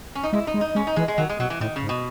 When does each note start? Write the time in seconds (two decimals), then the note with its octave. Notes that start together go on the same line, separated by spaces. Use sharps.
0.15 C#4
0.23 D#4
0.33 G#3 E4
0.47 D#4
0.54 G#3
0.61 D#4
0.75 G#3 C#4
0.87 D#4
0.96 E3 G#3
1.08 G#3
1.18 D#3 F#3
1.29 G#3
1.39 B2 F#3
1.50 E3
1.60 A2 D#3
1.76 C#3
1.83 G#2
1.89 B2